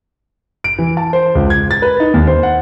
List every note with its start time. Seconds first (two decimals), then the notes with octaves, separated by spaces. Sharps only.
0.64 D7
0.78 E3
0.97 A5
1.13 C5
1.35 C#2
1.50 G#6
1.71 A6
1.82 B4
2.00 D#4
2.14 D#2
2.27 C5
2.43 F#5